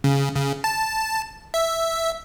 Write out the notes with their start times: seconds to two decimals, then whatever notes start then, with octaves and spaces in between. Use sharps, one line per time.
0.04 C#3
0.35 C#3
0.64 A5
1.54 E5